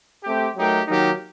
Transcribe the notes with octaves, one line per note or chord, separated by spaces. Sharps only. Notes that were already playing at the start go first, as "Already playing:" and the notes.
A3 C4 G4
F#3 A3 D#4 G4 A#4
D#3 F#3 A#3 D#4 G4